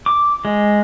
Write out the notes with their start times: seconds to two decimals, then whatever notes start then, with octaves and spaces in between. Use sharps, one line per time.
0.06 D6
0.45 G#3